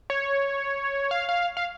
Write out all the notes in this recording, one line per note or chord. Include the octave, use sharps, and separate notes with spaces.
C#5
F5
F5
F5